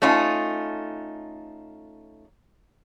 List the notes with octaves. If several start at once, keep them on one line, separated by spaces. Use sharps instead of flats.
A3 C#4 D#4 F4